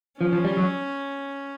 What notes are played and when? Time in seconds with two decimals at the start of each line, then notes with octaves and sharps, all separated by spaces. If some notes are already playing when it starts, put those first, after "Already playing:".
0.21 F3 C#4
0.32 F3
0.45 G3
0.57 F#3